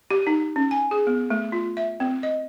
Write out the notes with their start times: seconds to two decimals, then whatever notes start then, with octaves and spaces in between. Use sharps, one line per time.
0.11 G4
0.27 D#4
0.56 C#4
0.71 G#5
0.91 G#4
1.07 B3
1.30 A3
1.52 F4
1.77 E5
2.00 C4
2.23 D#5